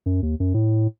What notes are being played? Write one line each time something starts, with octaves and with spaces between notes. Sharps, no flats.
F#2
D#2
F#2
A2